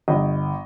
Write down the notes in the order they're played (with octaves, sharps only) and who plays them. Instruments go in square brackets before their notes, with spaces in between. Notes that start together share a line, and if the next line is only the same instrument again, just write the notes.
[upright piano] G1 D#5